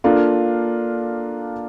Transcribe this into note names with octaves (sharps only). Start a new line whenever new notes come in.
A#3 D4 F4 A4